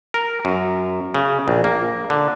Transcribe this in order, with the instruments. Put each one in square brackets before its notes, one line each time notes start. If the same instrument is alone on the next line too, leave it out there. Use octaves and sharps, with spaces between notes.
[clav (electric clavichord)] A#4
F#2
C#3
A#1
A#3
D3